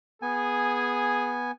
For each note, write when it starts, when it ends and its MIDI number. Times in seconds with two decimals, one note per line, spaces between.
0.22 1.51 59
0.22 1.40 68
0.22 1.51 80